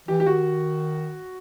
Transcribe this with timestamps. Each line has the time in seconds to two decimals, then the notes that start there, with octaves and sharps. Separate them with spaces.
0.08 E3 G4
0.20 G4
0.26 D#3 F#4